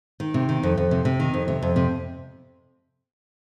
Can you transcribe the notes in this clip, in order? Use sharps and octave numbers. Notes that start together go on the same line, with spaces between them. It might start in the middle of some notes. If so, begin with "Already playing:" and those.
D#3
C3
D#3
F2
F2
C3
C3
D#3
F2
C3
F2
C3